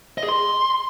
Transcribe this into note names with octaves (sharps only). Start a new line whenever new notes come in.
D#5
G#4
C6